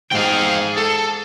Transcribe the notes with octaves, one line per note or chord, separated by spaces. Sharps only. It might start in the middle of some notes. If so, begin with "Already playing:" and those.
G#2 G#4 F5 G5
A4